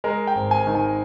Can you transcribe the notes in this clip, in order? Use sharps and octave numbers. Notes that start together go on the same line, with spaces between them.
G#3 A#4
G5
G#1
G#5
D#3
G#5